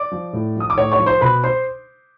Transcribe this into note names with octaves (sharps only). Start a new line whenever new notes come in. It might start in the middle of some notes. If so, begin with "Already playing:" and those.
Already playing: D5 D6
F3
A2
F3 D#6
D6
A2 C#5 C#6
C#5 C#6
F3
C5 C6
B2 B4 B5
C5 C6